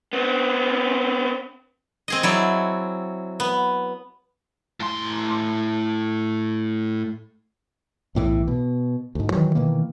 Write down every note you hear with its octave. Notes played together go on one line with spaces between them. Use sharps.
B3 C4
C4 G#4 D#5
F#3 E4 D5
B3
A2 C6
B1 A2 E3
B2
D2 G#2
D#3 E3 F#3
B2 D#3 E3 A#3